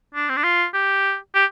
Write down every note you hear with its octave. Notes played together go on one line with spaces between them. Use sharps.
D4
C4
D4
F4
G4
G4